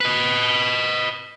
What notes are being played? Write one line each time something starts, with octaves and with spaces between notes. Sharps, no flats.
B4 D#5